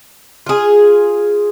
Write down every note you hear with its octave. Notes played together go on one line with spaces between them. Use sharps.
F4 G#4